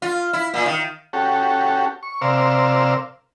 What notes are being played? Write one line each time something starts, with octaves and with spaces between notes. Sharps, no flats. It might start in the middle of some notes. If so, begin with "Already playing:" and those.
F4
E4
A#2
D#3
C#4 F#4 G4 A4
C#6
C3 A#4 C5 D5 F5 E6